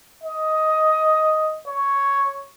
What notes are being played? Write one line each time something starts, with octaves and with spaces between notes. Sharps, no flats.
D#5
C#5